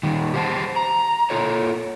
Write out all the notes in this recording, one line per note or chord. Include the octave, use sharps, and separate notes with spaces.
D#3 G3
G4 G#4 C5 D#5 A5
A#5
F4 A4 C#5